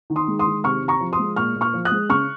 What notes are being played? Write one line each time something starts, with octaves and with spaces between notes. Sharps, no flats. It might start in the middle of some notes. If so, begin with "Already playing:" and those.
D#3
C6 D#6
G#3
C6 D#6
D#3
C3 C#6 F6
C3
A#5 C#6
F3
C6 D#6
G#3
A#2 C#6 F6
A#2
C#6 F6
F3
D#6 F#6
G#3
C#3 C#6 F6